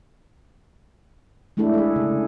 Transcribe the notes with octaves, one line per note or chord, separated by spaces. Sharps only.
G#3 A3 D4 E4 A4
G#4 A4
C#3